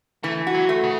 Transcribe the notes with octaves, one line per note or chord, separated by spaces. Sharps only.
E3 A3
F#4
F#3
A3
C#3